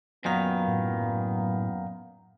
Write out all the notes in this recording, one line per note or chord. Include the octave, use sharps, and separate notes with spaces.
F#2 A#2 D#3 F#3 B3 F5 A#5
A2